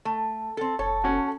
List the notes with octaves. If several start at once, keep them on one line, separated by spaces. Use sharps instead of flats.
A3
C4 A4
F1 A4 C#5
C#4 F#4